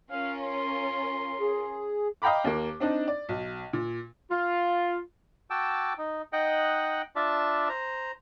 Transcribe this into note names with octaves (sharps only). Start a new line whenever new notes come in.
C#4 F4 A#4 F5
C6
G#4
D#5 F5 G5 A#5 B5 D6
D#2 A#3
C4 D4 D#4
D5
B1
A#2
F4
F#4 G5 A5 D6 E6
D#4
D#4 D#5 F#5 G5 F#6
D4 F4 D5 E5 A5
C5 A#5